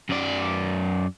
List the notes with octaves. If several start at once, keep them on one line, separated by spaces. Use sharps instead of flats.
F#2 D5